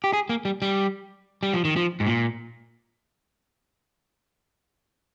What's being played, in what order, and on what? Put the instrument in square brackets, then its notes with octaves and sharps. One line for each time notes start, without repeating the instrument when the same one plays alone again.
[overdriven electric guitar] G4
G#4
A#3
G3
G3
G3
F3
D#3
F3
G#2
A#2